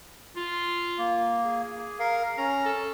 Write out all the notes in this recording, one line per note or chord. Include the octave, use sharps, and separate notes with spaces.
F4
A#3
G#4
A#4 F5
C#4 A#5
A4